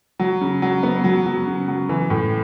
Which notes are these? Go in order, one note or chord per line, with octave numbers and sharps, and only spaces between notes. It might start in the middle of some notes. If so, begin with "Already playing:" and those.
F#3
C#3
F#3
B3
F#3
F#3
C#3
F#3
E3
A2